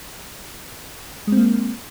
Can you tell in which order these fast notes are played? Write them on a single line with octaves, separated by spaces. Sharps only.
G#3 C4 A#3